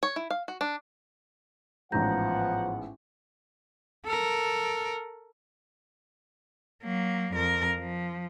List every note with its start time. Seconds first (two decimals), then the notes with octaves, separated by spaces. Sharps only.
0.03 C#5
0.16 E4
0.31 F5
0.48 F#4
0.61 D4
1.92 A1 G#2 F3 B3 F#5 A#5 G6 A#6
4.05 A4 A#4
6.83 F#3 A#3
7.33 F2 A#4
7.79 F3